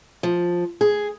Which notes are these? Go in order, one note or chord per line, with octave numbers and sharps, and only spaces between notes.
F3
G#4